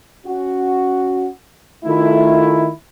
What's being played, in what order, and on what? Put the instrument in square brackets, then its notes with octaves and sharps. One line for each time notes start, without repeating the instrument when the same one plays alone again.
[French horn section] C#4 F#4
[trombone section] D#3 E4 [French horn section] A3 F4